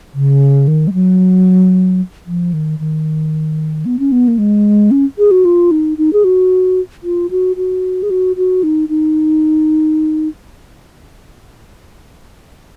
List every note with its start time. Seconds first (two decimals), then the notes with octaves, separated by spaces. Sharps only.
0.14 C#3
0.68 D#3
0.87 G#3
0.93 F#3
2.27 F3
2.53 D#3
2.79 D#3
3.85 B3
3.99 C#4
4.12 B3
4.28 A#3
4.38 G#3
4.91 C#4
5.18 G#4
5.31 F#4
5.45 F4
5.71 D#4
5.98 D#4
6.13 G#4
6.24 F#4
7.03 F4
7.31 F#4
7.56 F#4
8.03 G#4
8.10 F#4
8.37 F#4
8.63 D#4
8.89 D#4